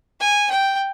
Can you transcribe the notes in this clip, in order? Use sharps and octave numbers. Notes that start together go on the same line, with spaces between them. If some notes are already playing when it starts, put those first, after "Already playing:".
G#5
G5